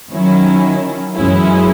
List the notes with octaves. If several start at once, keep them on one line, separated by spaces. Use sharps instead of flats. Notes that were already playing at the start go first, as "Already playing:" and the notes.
D#3 F#3 C#4 E4
F#2 E3 G#3 C#4 E4